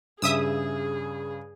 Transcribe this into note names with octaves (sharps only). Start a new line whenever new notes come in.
G2 C#3 G#4 E5 D#6 E6